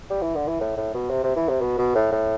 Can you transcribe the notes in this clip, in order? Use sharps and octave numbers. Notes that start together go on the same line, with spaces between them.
G3
E3
D3
E3
A2
A2
B2
C3
C3
E3
C3
B2
B2
A2
A2